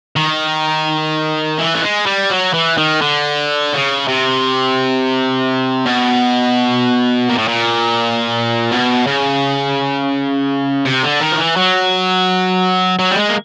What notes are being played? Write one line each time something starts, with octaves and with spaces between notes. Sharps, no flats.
D#3
E3
A3
G#3
G3
F#3
E3
D#3
D3
C#3
C3
B2
A#2
A2
A#2
B2
C#3
C3
D3
D#3
F3
E3
F#3
F#3
G3
G#3
A#3